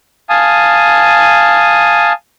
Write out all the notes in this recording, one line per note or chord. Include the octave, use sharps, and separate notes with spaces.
F5 G#5 A5 D#6